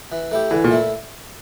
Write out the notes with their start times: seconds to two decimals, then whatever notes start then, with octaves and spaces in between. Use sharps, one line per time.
0.12 E3
0.31 A3 E4 G4
0.51 D3 E3
0.64 A#2
0.71 A3 E4